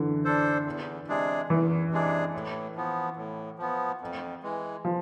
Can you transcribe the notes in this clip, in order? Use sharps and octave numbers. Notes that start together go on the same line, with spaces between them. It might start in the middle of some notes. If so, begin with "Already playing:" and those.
Already playing: D3 E3
D4 A4 C5
E2
C3 G#3 D4 G#4
E2 E3
C3 G#3 D4 G#4
A2
F3 B3
A2
F3 B3
F2
E3 G#3
F3